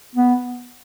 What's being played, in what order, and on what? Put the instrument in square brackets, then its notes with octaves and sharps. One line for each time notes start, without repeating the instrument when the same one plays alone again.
[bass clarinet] B3